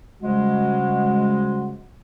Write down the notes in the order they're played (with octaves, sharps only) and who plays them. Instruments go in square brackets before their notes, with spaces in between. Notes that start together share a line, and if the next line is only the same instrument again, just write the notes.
[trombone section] C#3 F#4 [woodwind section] F3 G3 G#3